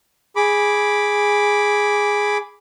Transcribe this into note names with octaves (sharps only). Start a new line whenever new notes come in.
G#4 B5 D6